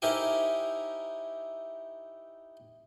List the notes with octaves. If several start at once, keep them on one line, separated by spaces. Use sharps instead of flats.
D#4 E4 G4 A#4 C5 G#5